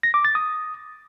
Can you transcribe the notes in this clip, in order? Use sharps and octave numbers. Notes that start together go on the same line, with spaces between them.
A#6
D6
A6
D#6